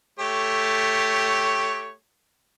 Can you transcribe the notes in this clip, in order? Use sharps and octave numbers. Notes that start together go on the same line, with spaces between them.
A3 G4 C#5